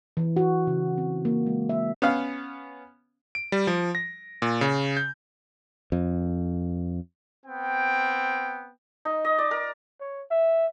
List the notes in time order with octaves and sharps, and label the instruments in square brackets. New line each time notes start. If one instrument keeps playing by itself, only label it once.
[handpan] E3
F#4
C#3
C4
A#3
G#3
E5
[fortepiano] B3 C#4 F5
[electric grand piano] D7
G3
F3
A#6
A#2
C#3
G6
[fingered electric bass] F2
[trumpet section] B3 C4 G5
[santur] D#4
D#5
D5
A#4
[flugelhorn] C#5
E5